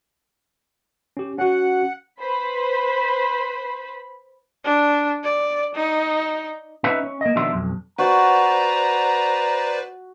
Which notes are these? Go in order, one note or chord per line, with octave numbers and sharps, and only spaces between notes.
C#4 G4
C#4 F#4 F#5
B4 C5 B5
D4
D5
D#4
C#4 D#4 B4 E5
C#4
A#3 D#5
B2 D#3 F3 D4 E5 C6
B1 F2
F#4 B4 C5 D5 A#5